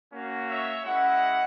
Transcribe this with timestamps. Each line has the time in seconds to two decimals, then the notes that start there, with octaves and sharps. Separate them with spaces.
0.13 A#3 C#4 F#4
0.49 C#5 E5
0.85 G#3 C#4 E4 D#5 F#5